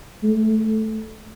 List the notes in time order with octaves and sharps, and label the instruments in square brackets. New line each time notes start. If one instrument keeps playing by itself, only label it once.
[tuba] A3